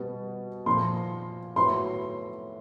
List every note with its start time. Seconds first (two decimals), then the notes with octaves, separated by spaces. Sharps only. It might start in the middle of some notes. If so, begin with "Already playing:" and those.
Already playing: B2 G3 B3
0.66 A#2 F3 A#3 C6
1.56 A2 F#3 B3 C6